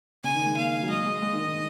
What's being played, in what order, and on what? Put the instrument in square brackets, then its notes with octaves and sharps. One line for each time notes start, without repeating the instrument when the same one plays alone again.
[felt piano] C#3 [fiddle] G#5
[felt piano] D#3
G#3
[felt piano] A#3 [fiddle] F5
[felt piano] F#3
[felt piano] G#3 [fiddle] D#5
[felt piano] G#3
G#3
D#3
D#3